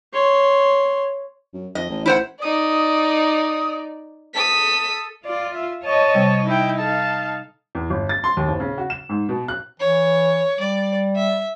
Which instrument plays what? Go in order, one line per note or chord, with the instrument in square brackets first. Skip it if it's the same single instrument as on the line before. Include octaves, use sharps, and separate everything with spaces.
[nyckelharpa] C#5 C6
[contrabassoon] F#2
[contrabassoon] F2 [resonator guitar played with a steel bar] D#5
[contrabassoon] A1
[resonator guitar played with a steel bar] E4 C5 F#5
[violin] D#4 D5 [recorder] D#6
[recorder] A4 [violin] D#6 B6
[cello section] F4 [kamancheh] D5
[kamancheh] E5
[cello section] C#5 D#5 [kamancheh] A5
[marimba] C3 G3 C4
[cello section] D#4 [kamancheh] E4 G5
[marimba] A4 [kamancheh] F5 A5
[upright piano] E2
G1
A6
C6
D#2
F#1
C#3
F#4
E7
G#2
B2
F#6
[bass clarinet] E3 [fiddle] C#5
[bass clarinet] G3 [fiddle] D5
[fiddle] E5